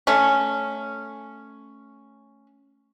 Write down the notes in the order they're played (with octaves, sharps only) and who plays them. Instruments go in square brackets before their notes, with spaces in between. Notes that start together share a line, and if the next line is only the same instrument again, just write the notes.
[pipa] A3 C#4